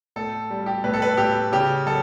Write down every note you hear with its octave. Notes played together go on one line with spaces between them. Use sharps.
A2 A4
G3
G4
A2 B4
A4
B4
A2 G4
C#3 G4
F#3 A4